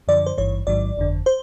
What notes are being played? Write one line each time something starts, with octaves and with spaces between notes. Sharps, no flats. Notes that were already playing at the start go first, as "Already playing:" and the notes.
F#2 D3 F3 D5
C5
G#1 G2 E3 C#5
A1 G#2 D#3 F#3 D5
G1 F2 D3
C5